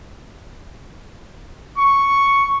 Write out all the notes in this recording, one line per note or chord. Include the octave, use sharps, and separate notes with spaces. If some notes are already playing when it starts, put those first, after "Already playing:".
C#6